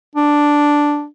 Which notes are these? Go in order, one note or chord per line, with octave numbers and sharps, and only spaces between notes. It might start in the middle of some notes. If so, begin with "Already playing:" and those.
D4